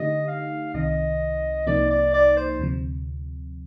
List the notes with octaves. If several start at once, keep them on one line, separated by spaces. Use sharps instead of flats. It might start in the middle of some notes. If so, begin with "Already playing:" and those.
Already playing: D3 A3 D#4 G4 D#5
F5
C2 C3 D#3 D#5
C2 C3 F3 A#3 D#4 D5
D5
D5
C5
D2 C3 F3